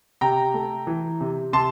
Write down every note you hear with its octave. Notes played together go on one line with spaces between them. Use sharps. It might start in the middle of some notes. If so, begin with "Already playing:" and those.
C3 G5 A#5
A3
E3
C3
C3 A5 C6